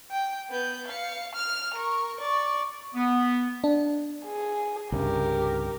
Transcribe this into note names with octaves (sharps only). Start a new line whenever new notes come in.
G5
B3 G6
F5 C#7
F6 F7
A#4 C#6
D5 C#6
B3
D4
G#4
C2 G2 C#3 G4 A#4